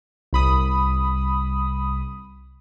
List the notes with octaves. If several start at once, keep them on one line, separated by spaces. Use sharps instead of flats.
C2 B5 D#6